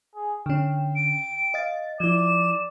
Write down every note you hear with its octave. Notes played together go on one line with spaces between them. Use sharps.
G#4
D3 C#4 G5
D7
D#5 F5 A6
F3 E4 D5 E7